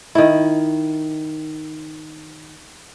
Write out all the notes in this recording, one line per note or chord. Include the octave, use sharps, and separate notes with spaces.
D#3 E4